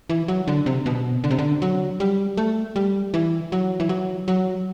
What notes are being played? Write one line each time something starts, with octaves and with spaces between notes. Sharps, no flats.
E3
F#3
D3
C3
B2
D3
C3
D3
F#3
G3
A3
G3
E3
F#3
E3
F#3
F#3